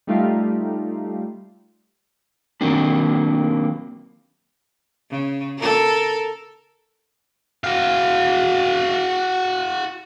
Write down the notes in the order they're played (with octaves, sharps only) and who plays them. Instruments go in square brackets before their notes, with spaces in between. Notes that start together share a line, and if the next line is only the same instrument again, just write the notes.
[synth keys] G3 A3 D#4 F4 G4 F5
[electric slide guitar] D#3 F#3 A#3 C4 D4
[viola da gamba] C#3
A4 A#4
[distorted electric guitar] F#4 F5